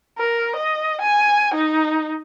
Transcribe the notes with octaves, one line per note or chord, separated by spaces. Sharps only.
A#4
D#5
G#5
D#4